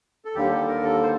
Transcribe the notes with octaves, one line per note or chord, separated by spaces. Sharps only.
A4
D#2 D3 G3 A#3 G4
A4
A#4
A4
C5